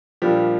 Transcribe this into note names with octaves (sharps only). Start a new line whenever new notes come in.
A#2 F3 G3 D4 G4